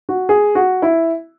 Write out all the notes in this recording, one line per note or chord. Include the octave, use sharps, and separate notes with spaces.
F#4
G#4
F#4
E4